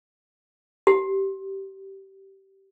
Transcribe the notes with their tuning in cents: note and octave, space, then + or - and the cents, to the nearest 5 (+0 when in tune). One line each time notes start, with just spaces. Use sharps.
G4 -20